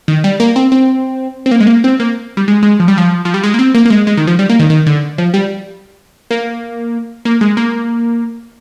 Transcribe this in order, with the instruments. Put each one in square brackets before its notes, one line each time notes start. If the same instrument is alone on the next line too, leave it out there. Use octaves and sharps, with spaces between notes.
[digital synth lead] D#3
G3
A#3
C4
C4
C4
A#3
G#3
A#3
C4
A#3
G3
G#3
G#3
F3
G3
F3
F3
G3
G#3
A#3
C4
A#3
A#3
G#3
G#3
D#3
F3
G3
A#3
D#3
D#3
D3
F3
G3
A#3
A#3
G#3
A#3